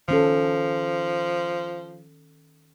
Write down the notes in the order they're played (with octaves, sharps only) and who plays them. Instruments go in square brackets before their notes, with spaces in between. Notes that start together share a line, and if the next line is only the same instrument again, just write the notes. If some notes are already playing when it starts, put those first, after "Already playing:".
[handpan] D#3 C#4 A4 [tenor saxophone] F3